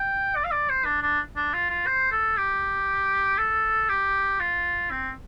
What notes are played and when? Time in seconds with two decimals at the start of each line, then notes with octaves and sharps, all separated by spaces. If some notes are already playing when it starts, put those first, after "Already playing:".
Already playing: G5
0.36 D5
0.44 F5
0.52 D5
0.69 C5
0.85 D4
1.02 D4
1.36 D4
1.53 F4
1.70 F4
1.86 C5
2.12 A4
2.37 G4
3.38 A4
3.89 G4
4.40 F4
4.91 C4